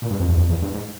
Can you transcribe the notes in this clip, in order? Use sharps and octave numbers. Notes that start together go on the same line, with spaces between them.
A#2
G2
F2
E2
F2
E2
G2
G#2